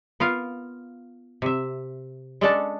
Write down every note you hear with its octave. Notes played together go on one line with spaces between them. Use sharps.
B3 F4 A#4 F5
C3 E5
G#3 C#4 D4 A4 D5 A5